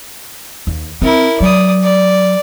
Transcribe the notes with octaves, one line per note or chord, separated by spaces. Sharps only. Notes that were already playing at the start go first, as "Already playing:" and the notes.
D#2
C4 E4 A#4
F#3 D5 D#6
D5